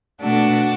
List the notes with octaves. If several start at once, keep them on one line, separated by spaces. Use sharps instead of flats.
B2 A3 D4 F#4